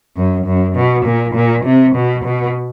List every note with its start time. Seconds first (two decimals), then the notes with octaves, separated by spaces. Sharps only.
0.16 F#2
0.46 F#2
0.75 B2
1.05 A#2
1.35 A#2
1.65 C3
1.95 B2
2.25 B2